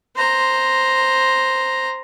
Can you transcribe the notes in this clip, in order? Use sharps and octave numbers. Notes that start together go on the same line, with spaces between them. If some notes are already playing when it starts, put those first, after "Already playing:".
C5 A#5